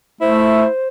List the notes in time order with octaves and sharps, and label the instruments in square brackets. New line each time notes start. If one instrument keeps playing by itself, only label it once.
[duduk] A3 [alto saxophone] E4 [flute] C5